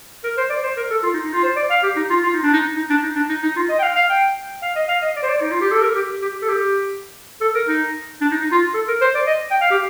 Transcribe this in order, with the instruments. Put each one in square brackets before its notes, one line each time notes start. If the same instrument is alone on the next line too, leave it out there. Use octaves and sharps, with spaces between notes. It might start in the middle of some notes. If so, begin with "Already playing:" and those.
[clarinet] A#4
C5
D5
C5
A#4
A4
F4
D#4
D#4
F4
C5
D5
F5
G4
D#4
F4
F4
D#4
D4
D#4
D#4
D4
D#4
D4
D#4
D#4
F4
D#5
G5
F5
F5
G5
F5
D#5
F5
D#5
D5
C5
D5
D#4
F4
G4
A4
A#4
G4
G4
A4
G4
A4
A#4
D#4
D4
D#4
D#4
F4
A4
A#4
C5
D5
D#5
G5
F5
G4